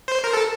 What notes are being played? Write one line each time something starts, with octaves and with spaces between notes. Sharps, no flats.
C5
A#4
A4